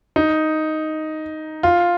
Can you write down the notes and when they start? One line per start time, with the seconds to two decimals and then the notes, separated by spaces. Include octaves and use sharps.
0.16 D#4
1.63 F4